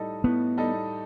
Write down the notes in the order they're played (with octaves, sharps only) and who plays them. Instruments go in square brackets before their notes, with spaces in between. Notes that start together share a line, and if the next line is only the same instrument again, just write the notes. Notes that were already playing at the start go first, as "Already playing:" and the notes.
Already playing: [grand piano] A2 G3 D#4 A4 D#5
[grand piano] A2 [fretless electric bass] B3
[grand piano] G3 D#4 A4 D#5